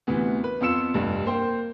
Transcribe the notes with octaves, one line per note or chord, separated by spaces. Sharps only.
D2 C3 E3 B3
B4
F2 B3 F4 E6 C#7 E7
F1 G2
A#3 C5 G5